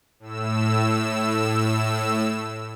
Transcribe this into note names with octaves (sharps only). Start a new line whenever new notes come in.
A2 E6